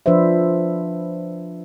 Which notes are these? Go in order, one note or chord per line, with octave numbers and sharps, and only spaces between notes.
F3 D4 B4 C5 E5